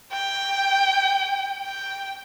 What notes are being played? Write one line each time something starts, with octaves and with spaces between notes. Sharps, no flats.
G5
G5